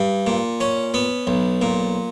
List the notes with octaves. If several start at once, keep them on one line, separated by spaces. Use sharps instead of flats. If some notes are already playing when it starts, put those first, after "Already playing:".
Already playing: G2
A#2
C#4
B3
B1
A#2